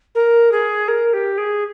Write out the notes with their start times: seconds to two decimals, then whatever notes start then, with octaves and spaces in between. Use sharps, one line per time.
0.15 A#4
0.52 G#4
0.88 A#4
1.13 G4
1.38 G#4